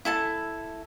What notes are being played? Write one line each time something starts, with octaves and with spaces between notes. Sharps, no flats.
E4 A4 A5